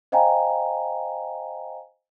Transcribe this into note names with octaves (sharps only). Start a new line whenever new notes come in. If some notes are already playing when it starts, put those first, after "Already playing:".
C5 D#5 F5 G5 G#5 A#5